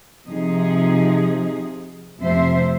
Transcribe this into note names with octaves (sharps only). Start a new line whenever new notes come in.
C3 F3 D#4 G#4
F2 C3 F3 A3 C5 E5